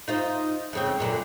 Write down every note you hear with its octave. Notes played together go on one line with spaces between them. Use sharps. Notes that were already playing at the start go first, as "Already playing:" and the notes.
D#4 F4 C5
F2 C#3 C4
F#2 A#2 D3